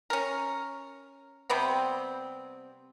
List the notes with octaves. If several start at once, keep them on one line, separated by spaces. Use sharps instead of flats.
C#4 A#4
C3 G3 B3 C4